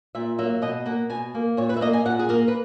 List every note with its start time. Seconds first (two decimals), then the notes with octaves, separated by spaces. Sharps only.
0.15 A#2 E5
0.39 F#3 A#3 E5
0.62 B2 D#5
0.86 A#3 F#5
1.10 B2 G#5
1.34 A#3
1.57 A#2 C#5
1.69 B4
1.77 E5
1.81 A#3 D#5
1.93 G#5
2.05 A#2 F#5
2.19 G#4
2.29 A#3 A#4
2.48 B4